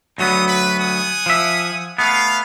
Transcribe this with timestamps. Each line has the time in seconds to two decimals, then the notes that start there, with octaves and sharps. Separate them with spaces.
0.18 D2 F#3 B3 D#4 E4 D#6
0.47 B4
0.79 F#5 G#5 D#6
1.26 F3 E5
1.98 A3 B3 F5